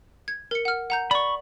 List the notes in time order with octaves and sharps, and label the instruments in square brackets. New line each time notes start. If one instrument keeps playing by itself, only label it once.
[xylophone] G#6
A#4 C#7
F#5 F6
F#5 A#5 G6
[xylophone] D5 [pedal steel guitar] B5 C#6